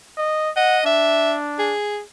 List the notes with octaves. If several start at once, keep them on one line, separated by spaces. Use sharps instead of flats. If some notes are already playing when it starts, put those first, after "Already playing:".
D#5
D#5 F#5
D4 E5
G#4